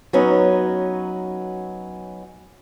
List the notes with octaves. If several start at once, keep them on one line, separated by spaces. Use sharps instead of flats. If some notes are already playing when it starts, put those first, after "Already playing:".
F#3 B3 C#4 D#4